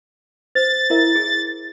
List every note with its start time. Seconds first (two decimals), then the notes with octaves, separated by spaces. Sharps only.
0.55 C5 A6
0.90 E4 A#4 E5
1.15 G#4